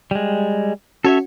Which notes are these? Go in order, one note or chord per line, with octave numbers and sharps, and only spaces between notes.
G3 G#3
C#4 F#4 A4 C#5 E5